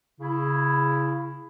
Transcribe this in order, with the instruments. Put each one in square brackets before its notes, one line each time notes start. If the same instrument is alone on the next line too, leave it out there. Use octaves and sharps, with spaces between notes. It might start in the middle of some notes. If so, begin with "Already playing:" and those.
[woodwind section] C#3 E4